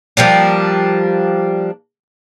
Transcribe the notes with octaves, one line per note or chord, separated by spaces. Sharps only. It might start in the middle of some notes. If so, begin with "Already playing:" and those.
F3 G3 A#3 D4